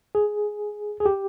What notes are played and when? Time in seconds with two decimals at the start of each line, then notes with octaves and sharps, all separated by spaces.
0.15 G#4
1.00 G#4
1.06 G4